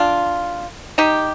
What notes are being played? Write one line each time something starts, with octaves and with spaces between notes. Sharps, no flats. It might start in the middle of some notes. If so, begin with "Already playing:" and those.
Already playing: D4 F4
D#4 G4